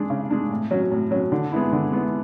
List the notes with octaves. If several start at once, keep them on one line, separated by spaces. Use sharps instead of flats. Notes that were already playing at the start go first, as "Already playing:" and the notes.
Already playing: G#3 D4
C#3
G#3 D4
A2
F#3 C#4
A2
F#3 C#4
D3
G#3 B3 E4
D3
G#3 B3 E4